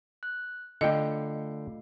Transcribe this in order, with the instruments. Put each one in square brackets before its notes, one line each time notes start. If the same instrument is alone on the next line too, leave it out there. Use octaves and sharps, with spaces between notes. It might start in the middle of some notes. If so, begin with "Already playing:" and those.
[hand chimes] F#6
[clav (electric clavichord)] D3 G5 [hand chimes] A3 F4 C7 [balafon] D#5